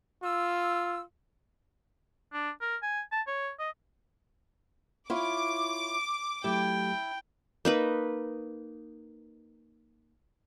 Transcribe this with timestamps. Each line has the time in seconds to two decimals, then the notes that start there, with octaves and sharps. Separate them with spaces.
0.23 F4 E6
2.33 D4
2.61 A#4
2.83 G#5
3.12 A5
3.27 C#5
3.59 D#5
5.10 E4 F4 C#5 D6
6.44 F#3 A3 E4 G4 G5
7.65 A#3 D#4 B4